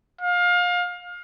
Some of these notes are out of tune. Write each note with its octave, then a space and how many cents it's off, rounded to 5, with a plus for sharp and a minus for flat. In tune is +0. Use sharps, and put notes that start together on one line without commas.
F5 +25